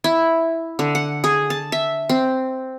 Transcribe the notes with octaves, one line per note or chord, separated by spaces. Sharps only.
E4
D3
F#5
G#4
A5
E5
C4